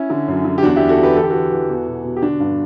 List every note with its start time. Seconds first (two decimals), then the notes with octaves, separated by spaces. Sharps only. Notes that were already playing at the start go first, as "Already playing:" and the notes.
Already playing: C#4 E4
0.10 D3
0.28 F#2
0.45 D3
0.58 G4
0.63 E2 D4 F#4
0.76 E2 E4 G4
0.89 F#4 A4
0.99 D3 G4 B4
1.16 E3 A4
1.23 G4
1.30 E3 F#4 A4
1.51 E3
1.70 E2
1.87 B2
2.04 B2
2.17 G4
2.22 D3 D4 F#4
2.40 G2